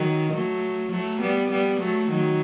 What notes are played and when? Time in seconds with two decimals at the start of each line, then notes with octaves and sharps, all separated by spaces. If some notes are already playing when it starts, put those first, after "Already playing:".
Already playing: D#3 F#3
0.32 F#3 A3
0.91 F#3 A3
1.20 G3 B3
1.51 G3 B3
1.80 F#3 A3
2.10 D#3 F#3